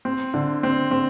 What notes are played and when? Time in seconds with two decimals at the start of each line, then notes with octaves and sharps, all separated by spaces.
0.05 C4
0.34 D3
0.63 C4
0.91 C4